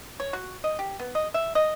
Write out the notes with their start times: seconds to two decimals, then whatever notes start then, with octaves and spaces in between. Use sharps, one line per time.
0.20 C#5
0.33 F#4
0.64 D#5
0.79 G4
0.99 B3
1.15 D#5
1.34 E5
1.55 D#5